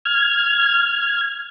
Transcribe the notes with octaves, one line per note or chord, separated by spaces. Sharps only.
F6 G#6